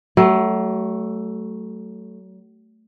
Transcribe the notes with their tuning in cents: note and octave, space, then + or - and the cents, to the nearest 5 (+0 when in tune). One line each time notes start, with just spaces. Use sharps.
F#3 +35 A3 +0